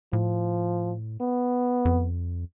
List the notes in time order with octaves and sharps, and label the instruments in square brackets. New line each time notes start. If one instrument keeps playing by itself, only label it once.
[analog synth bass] A2 [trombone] F3
[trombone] B3
[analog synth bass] F2